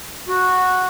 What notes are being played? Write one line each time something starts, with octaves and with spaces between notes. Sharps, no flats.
F#4